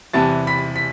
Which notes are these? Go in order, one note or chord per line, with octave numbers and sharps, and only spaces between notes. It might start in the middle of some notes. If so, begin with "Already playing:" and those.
E2 C3 E3 G3 B3 A5 A6
B5 B6
B6